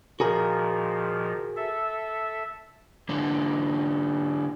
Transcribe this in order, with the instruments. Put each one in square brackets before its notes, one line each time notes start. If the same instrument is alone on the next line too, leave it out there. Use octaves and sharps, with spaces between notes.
[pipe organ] A#2 D#3 F3 [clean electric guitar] F#4 G#4 A#4
[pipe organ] A4 E5
[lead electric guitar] G#2 D3